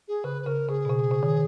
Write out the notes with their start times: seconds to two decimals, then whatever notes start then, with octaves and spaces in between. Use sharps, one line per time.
0.08 G#4
0.24 C#3 B4
0.42 B4
0.46 C#3 A#4
0.69 C#3 G#4
0.85 B2
0.90 C#3
1.11 C#3
1.23 D#3